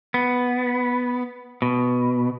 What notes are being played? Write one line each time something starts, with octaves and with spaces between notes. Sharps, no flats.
B3
B2